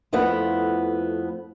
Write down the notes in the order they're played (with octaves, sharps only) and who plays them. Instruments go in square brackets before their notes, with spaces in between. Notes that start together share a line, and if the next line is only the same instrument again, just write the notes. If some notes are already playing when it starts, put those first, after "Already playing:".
[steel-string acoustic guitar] F2 F3 A3 B3 E4 B4